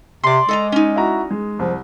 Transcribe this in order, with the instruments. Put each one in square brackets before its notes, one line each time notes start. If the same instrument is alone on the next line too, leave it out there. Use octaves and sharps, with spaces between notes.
[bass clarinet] C3 [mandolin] D5 C6
[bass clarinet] G#3 [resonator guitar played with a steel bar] A4 D#5 A#5
[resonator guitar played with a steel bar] C#4 D#4
[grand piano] E4 F#4 A#5
G#3
[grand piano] C2 [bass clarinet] F3